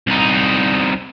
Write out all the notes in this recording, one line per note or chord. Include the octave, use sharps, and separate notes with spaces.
C2 D#4